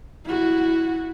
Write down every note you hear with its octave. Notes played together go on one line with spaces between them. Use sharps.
E4 F#4